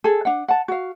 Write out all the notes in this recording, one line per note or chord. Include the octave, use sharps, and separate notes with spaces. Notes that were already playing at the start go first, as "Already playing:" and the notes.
G#4 A4
D4 F#5
F#5 A5
F#4 F5